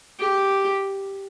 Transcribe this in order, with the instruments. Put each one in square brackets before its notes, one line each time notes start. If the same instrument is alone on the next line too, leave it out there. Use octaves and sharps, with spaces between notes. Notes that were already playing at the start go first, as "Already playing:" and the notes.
[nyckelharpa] G4